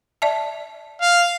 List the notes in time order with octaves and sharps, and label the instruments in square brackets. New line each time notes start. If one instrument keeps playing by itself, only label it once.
[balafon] D5 E5 A5
[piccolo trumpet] F5